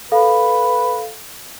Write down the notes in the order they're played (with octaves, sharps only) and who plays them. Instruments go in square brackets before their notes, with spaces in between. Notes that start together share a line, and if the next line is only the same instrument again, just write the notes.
[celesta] A4 F5 [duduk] B4